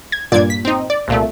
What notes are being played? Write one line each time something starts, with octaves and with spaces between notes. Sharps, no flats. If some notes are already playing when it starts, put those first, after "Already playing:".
G#6
G2 A#2 D5 G#6
B6
C4 D#4
D5
C2 A#2 A3